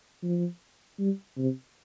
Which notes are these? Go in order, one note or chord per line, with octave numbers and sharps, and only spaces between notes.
F3
G3
C3